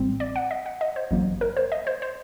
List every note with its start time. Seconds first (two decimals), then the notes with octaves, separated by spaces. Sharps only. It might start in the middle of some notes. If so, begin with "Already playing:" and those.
Already playing: A1 A2 G3 C4
0.20 D5
0.36 F#5
0.51 D#5
0.66 F#5
0.81 D#5
0.96 C5
1.11 A1 G2 F#3 A#3
1.41 A#4
1.57 C5
1.72 D#5
1.87 C5
2.02 C5